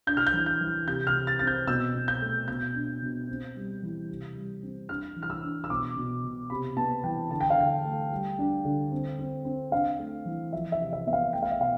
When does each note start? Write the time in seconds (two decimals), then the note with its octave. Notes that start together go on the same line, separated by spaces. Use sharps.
0.07 D4 G6
0.17 F6
0.27 G6
0.33 E3
0.46 G6
0.61 E3
0.87 C3 G6
1.07 F6
1.15 C3
1.27 A6
1.39 C4 A6
1.47 G6
1.67 B2 E6
1.95 B2
2.08 G6
2.22 A3
2.48 B2 G6
2.75 D4
3.02 B2
3.28 C4
3.56 G3
3.83 E3
4.09 C3
4.36 G3
4.63 C4
4.89 D4 F6
5.16 E3
5.23 F6
5.30 E6
5.43 D4
5.64 E6
5.70 B2 D6
5.96 B2
6.24 B2
6.50 C3 B5
6.77 B3 A5
7.04 E3 G5
7.31 D3 A5
7.41 G5
7.50 F5
7.58 D3 G5
7.84 A3
8.11 G3
8.39 D4
8.65 D3
8.92 C4
9.19 C4
9.45 C4
9.72 D4 F5
9.99 A3
10.25 E3
10.53 F3 E5
10.72 E5
10.80 C3
10.93 E5
11.07 B3 E5
11.13 F5
11.33 A3 G5
11.43 F5
11.51 E5
11.60 B2 F5